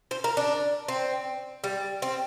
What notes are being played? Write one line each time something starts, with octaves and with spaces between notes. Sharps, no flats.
C5
A#4
D4
C4
G3
C4